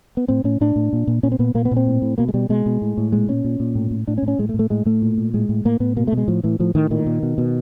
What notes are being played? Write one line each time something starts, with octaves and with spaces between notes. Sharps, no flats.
B3
A2 C4
A2 C#4
A2 D4
A2
A#2
A#2
A#2 C#4
C4
A#2 B3
A#2 A#3
B3
A#2
C4
A2
A2
B2 A#3
G#3
B2 G3
B2 G#3
B2
A2
A2
A#2 G#3
A#2 C#4
A#2
A#2
A2
A2
A2 D4
C#4
A2
C#4
A2 G#3
A3
A2
A3
A2 G#3
A2 A3
A#2
A#2
A2 G#3
A2
A2 A#3
A2 B3
B2 A#3
A3
B2
G#3
A2 F3
A2 E3
A2 F3
A2 D#3
A#2 D#3
A#2
B2
B2